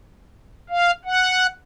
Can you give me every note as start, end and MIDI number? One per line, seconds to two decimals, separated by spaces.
0.69 0.91 77
1.05 1.47 78